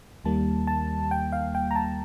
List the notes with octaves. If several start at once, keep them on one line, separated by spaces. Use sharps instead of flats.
D#2 D#3 G3 A#3 A5
A5
G5
F5
G5
A#5
A5